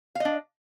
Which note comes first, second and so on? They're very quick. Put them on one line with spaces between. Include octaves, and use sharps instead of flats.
F5 D#5 D4